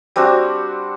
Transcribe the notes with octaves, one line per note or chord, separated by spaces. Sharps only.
G3 C4 D4 F#4